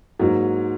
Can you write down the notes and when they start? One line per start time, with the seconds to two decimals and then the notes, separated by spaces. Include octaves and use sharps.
0.19 G#2 F#3 A#3